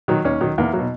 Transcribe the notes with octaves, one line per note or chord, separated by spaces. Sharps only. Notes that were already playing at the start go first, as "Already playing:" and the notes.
D#3 F#3
D#2 C#4
D#3 F#3
E2 A#3
F#3
B2